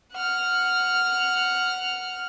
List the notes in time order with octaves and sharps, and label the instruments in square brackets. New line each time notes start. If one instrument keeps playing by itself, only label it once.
[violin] F#5 F6